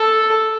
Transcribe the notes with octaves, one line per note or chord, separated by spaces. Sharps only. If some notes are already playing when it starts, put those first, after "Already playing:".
Already playing: A4